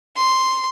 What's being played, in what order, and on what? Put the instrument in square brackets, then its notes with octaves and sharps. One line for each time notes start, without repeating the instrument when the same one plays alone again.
[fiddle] C6